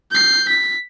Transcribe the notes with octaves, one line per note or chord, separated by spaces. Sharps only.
G6 C7
B6